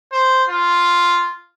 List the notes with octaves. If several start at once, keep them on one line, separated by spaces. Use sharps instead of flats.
C5
F4